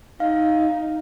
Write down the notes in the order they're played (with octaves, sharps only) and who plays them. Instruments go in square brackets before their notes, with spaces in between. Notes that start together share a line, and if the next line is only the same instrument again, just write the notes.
[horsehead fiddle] D#4 [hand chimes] F5